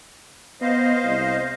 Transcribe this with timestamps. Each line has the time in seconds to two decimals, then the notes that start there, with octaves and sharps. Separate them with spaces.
0.61 B3 C5 D#5 F5
1.04 C2